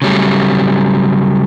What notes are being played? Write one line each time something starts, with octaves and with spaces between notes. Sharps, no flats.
C#3 F#3 G3 A3